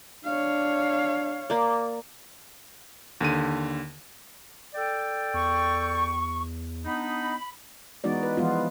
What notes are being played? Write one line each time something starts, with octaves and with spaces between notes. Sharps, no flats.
D4 C#5 F5
A#3 D5
D#2 D3 D#7
A4 D5 G5
E2 C#6
B3 D4 D#4 B5
E3 G#3 B3 D#4 F#4 D5
B4
E3 F3 G#3 B3 F4